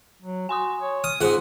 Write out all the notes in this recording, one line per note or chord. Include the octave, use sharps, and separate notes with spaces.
F#3
F#4 G#5 C6 D#6
C#5
D#6 F6
G#2 C4 F4 F#5 C6 D#6